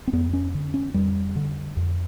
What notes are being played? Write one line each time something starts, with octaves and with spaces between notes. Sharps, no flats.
C4
F2 B3
C#4
D3
C#4
F2 G3
D3
F2